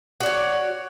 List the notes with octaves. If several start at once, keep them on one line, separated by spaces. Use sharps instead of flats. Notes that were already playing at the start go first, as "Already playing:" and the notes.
F#4 C#5 D5